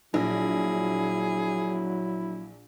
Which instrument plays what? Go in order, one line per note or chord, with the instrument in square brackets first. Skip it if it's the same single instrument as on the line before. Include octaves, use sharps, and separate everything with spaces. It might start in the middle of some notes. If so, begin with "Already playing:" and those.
[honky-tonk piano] A#1 [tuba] F#3 [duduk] E4 [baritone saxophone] G#4